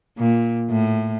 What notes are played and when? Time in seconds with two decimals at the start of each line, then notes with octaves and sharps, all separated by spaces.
0.18 A#2
0.70 A2